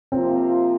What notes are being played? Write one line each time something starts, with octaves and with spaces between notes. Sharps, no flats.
C3 F3 A#3 C4 F4